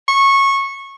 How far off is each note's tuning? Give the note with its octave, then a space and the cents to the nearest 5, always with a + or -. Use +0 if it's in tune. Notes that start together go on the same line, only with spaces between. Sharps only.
C#6 -15